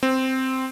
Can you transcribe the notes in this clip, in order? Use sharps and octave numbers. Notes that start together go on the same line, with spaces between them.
C4